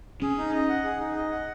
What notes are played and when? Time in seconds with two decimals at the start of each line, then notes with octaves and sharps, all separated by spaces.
0.22 C#4 G#4
0.38 D#4
0.53 D#5
0.69 F#5
0.85 G#4
1.00 D#4
1.16 D#5
1.31 F#5